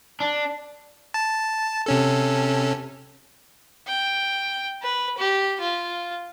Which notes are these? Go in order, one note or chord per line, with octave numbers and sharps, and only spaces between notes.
D4
A5
C3 C#4 A4
G5
B4
G4
F4